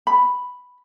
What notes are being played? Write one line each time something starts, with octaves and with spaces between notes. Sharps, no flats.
B5